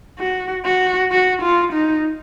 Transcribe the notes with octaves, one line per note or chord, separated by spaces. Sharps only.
F#4
F#4
F#4
F4
D#4